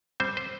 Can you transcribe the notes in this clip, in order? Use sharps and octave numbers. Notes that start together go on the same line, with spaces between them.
G3 C4 C5
C5